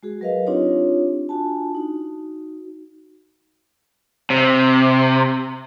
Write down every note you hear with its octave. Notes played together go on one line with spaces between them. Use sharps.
G#3 F#4 G#4
F#3 A#4 B4 D#5 F5
C4 D4 D#4 F4 G4 C#5
D4 F4 F#4 G#5 A5
D#4 F#4
C3